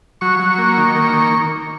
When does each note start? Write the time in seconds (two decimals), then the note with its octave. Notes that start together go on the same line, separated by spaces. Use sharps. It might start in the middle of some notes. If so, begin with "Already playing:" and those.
0.21 F#3 C#6
0.40 F#3
0.58 A#3
0.77 D#3
0.95 A#3
1.13 D#3